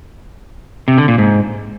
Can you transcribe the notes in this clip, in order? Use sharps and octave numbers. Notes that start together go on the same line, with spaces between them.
C3
D3
A#2
G#2